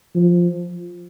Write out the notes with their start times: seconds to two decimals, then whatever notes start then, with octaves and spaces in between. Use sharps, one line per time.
0.15 F3